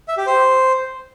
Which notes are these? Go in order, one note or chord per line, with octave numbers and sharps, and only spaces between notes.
E5
G4
C5